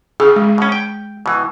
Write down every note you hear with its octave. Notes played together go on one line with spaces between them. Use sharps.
C#3 G#4
G#3
B2 C#4
G5
B2 E3